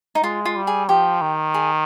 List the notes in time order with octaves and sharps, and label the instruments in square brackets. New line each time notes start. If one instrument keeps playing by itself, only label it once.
[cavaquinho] D#4
[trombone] G#3 [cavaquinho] F4
[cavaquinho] F4
[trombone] G3
[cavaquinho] G#4
[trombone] F3 [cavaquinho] G4
[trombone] D#3
[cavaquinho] G#4